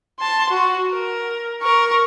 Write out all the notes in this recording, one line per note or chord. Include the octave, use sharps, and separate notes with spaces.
A5 C6
F#4
A#4
A#4 C#6